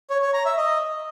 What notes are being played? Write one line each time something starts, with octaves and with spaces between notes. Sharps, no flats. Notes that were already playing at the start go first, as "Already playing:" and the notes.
C#5
C#5
A#5
E5
D#5